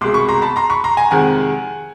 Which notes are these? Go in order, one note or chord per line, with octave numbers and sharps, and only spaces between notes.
C2 B2 G#3 C6 D6
B5 C#6
A#5 C6
A5 B5
A#5 C6
B5 C#6
A#5 C6
G#5 A#5
F2 C3 D#3 G#3 F#5 G#5